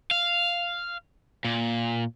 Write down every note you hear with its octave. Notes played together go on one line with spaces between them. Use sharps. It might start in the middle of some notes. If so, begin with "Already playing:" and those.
F5
A#2